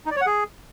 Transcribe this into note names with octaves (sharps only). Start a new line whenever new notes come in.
D#4
D5
C#5
F#5
G#4